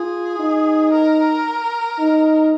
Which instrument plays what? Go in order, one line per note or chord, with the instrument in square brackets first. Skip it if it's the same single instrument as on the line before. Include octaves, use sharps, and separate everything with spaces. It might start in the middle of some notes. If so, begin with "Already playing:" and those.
Already playing: [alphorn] F4 [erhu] G#4
[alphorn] D#4
[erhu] A#4
[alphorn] D#4